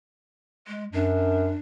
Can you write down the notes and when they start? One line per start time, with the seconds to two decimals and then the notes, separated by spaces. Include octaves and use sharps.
0.68 G#3
0.93 F#2 D4